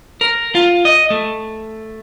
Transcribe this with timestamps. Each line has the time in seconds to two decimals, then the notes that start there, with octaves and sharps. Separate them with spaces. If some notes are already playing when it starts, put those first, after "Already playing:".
0.21 A#4
0.55 F4
0.85 D#5
1.10 A3